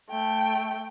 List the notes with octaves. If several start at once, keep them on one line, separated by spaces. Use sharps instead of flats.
A3 G5